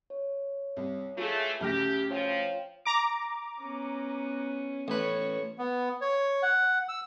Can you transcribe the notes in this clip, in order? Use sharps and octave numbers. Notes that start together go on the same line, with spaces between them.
C#5
C2
E3 G#3 A3 F4 G#4
D2 C#3 G4 A5 F6 A#6
F3 C#5 F5 G5
A#5 D6
B3 C#4
A1 B4 C#5
B3
C#5
F#5
E6